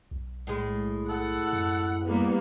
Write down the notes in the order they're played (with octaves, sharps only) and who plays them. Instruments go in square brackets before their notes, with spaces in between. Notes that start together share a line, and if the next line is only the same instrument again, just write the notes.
[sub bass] B1
[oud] A2 G#3
[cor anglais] A4 [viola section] F#5
[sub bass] F#2
[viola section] G3 A#3 B3